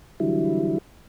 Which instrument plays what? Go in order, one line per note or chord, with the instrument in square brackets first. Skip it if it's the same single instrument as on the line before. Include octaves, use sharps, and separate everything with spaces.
[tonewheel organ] D3 E3 F#3 G3 E4